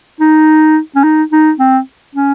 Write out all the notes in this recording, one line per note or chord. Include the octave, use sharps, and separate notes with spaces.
D#4
C#4
D#4
D#4
C4
C#4